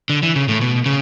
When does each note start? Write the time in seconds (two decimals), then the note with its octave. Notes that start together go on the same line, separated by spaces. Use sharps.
0.10 D3
0.23 E3
0.36 C#3
0.49 A2
0.61 B2
0.86 C#3